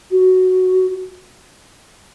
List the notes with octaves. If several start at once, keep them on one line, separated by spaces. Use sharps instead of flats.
F#4